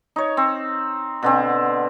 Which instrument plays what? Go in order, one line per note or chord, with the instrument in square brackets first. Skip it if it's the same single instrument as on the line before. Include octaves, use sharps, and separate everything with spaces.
[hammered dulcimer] D#4 C#5
C4
B2 D3 C4